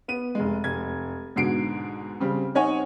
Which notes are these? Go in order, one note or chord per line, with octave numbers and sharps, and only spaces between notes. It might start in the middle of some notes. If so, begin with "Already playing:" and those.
B3 D#7
F1 G#3
F1 G#6
G#2 B2 D3 C7 D7
C#3 G3 C4
C4 D#4 C#5 F#5 G#5